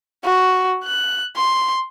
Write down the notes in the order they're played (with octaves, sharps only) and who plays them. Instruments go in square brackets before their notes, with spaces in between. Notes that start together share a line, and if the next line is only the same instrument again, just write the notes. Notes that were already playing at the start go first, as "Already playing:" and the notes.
[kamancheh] F#4
F#6
C6